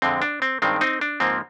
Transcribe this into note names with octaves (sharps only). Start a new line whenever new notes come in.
F2 D3 G#3 C4
D4
C4
G2 D#3 G#3 C4
C4 D#4
D4
G#2 F3 A#3 C4